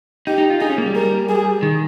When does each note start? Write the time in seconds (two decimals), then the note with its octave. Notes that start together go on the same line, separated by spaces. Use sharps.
0.27 D#4 G4
0.38 D#4
0.50 F4
0.61 D#4 G#4
0.70 C#4
0.78 A#3
0.86 G3
0.95 A#4
1.29 G#4
1.63 D#3